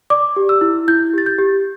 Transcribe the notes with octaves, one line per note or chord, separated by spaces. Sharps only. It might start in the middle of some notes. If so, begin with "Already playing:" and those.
D5 D6
G4
E6
E4
E4 G6
G4 A6
G6
G4